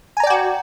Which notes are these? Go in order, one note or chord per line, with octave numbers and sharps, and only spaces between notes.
F#4 D5 G5 G#5 A#5